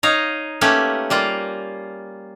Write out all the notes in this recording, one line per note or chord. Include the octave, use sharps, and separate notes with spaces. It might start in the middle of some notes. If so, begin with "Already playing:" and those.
D#4 C#5 D#5 F5
A3 A#3 C#4 G4 B4 C#5
G3 A#3 F4